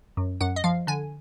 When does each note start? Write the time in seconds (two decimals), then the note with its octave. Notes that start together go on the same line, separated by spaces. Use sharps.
0.17 F#2
0.41 F#2 F#5
0.56 D#5
0.64 F3 F5
0.87 D3 G#5